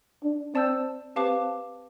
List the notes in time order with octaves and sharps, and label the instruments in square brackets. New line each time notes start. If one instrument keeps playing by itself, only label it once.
[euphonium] D4
[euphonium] C4 [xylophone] D5 A5 E6 G6
[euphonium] C4 [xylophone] G4 B4 F5 A5 D6